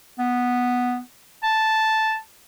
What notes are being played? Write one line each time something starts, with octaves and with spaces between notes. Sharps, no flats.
B3
A5